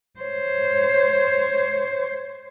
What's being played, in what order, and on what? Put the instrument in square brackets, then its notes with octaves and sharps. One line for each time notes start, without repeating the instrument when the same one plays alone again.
[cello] C5 C#5